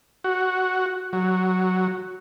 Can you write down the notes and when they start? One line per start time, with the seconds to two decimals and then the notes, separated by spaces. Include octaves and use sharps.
0.24 F#4
1.13 F#3